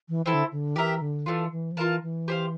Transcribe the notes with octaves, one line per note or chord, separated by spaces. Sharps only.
E3
E3 C4 E4 A4
D3
D3
E3 G4 A#4 E5
D3
E3 A3 D4 F4
E3
F3
E3 F4 A#4 F5 A5
E3
G4 C5 F5